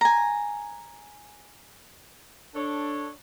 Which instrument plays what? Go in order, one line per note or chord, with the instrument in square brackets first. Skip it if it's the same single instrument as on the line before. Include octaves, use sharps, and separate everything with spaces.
[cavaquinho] G#5 A#5
[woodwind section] D4 [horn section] A4 C#5